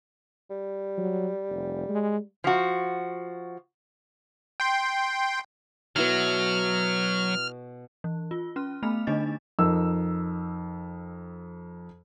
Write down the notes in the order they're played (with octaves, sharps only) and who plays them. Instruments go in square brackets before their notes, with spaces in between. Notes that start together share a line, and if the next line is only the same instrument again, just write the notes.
[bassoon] G3
[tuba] F#3
F1
G#3
[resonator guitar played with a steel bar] F3 F#4
[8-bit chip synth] G5 C6
[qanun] B2 E4 A4 [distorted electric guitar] F#3 [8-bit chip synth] F6
[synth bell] E3
F4
C#4 F6
A3 B3 B5 F6 F7
D3 A3 D4 D#4 D#5 A6
[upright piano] F2 D#4 A#4 E6